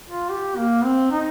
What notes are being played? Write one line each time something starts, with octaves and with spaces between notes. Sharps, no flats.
F4
G4
A#3
C4
D#4